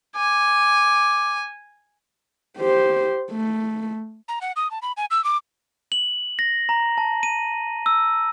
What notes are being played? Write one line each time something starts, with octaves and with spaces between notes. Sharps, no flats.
G#5 D6
G4 C5
A3
A#5
F#5
D#6
A5
B5
G#5
E6
D6
F#7
A#6
A#5
A5
D#7
E6